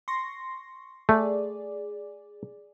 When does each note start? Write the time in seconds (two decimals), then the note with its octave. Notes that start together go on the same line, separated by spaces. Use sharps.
0.08 C6 C#6 A#6
1.09 A3 G#4 D5